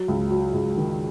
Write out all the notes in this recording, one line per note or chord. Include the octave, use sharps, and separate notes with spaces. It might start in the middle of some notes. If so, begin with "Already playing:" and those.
Already playing: F#3
C#2
F#3
C#2
D#3